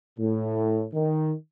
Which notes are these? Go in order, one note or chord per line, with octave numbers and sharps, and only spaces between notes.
A2
D#3